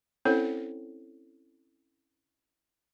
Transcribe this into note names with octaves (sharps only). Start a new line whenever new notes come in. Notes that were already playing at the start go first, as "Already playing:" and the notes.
C4 C#4 E4 A4 C5 C#5